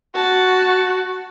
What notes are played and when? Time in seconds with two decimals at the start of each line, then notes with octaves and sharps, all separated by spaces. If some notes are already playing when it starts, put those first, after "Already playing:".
0.15 F#4 A5